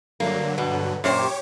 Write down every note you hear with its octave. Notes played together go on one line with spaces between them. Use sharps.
G2 D3 F#3 A#3
B2 B3
F#2 A#2 G4 C5 C#5 D6